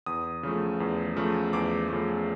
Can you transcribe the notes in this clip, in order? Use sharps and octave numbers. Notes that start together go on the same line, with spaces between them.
E2 D#6
C#3 F3 A3
E2
C#3 F3 A3
E2 D6
C#3 F3 A3